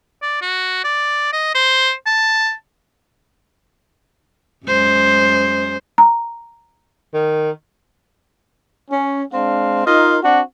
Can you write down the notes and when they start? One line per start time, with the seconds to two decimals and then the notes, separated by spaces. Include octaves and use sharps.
0.22 D5
0.42 F#4
0.84 D5
1.33 D#5
1.55 C5
2.06 A5
4.66 F#2 G#3 C5
5.98 A#5
7.14 D#3
8.90 C#4
9.34 G#3 C4 D4 F5
9.86 D#4 F4 A#4 D#5
10.22 C4 D4 F#4